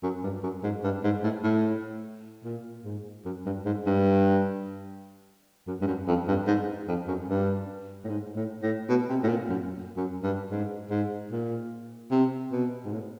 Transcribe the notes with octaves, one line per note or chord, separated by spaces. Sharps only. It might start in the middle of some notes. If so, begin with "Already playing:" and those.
F#2
G2
F#2
G#2
G2
G#2
A2
A2
A#2
G#2
F#2
G2
G#2
G2
F#2
G2
F#2
F2
G2
G#2
F2
F#2
G2
A2
G#2
A2
A2
B2
C3
A2
A#2
F#2
F#2
G2
G#2
G#2
A#2
C3
B2
G#2
A2